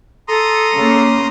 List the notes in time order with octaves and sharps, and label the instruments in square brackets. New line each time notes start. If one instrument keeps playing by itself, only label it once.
[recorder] A4 [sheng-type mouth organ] A#5 C6 D#6
[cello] C#3 A#3